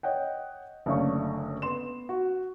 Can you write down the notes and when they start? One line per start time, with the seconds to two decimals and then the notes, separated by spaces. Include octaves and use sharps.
0.03 C#5 D#5 F#5 G5
0.86 F#1 D3 A3 C#5 F5 C#6
1.62 B3 C6 E7
2.09 F#4